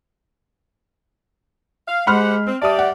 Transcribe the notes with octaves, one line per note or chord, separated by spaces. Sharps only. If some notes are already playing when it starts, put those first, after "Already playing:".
F5
G#3 G4 C5 F#5 B5 C6 F6
C4
G3 G4 D5 E5 A5 D#6
F#5